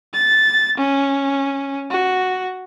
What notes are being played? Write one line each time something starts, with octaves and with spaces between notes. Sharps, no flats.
A6
C#4
F#4